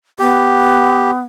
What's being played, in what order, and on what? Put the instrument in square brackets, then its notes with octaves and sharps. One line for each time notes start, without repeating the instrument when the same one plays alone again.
[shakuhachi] B3 [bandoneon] G4